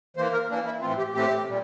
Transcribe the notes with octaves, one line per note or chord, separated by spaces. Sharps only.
E3 A#3 C5
A#4
E3 A#3 D4
E4
A2 E3 A3 C4 F4
G4
A2 E3 A3 C4 G4
A#2 G3